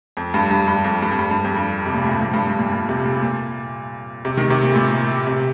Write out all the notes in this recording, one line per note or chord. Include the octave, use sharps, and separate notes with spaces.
F2
G2
G2
G2
F2
G2
F2
G2
G2
F2
G2
C3
A#2
A2
G2
F2
G2
G2
A#2
A#2
C3
A#2
A#2
C3
D#3
C3
A#2
A2
A#2
C3